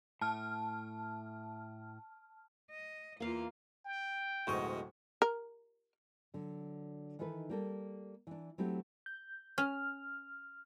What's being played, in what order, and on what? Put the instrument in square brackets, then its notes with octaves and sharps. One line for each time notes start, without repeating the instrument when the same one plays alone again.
[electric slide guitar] A2 [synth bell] A5 F6
[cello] D#5
[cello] E2 F4 [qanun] A#3 F5
[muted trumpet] G5
[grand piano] D1 D2 C#6 [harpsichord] G#2 B2 D#5
[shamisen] A#4
[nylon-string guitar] D3 F#3
D#3 E3 D#4 E4 A4 B4
G3 A#3 A4
E3 D4
F#3 A3 C4 E4 G4
[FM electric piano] G6
[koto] C#4 [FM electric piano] F6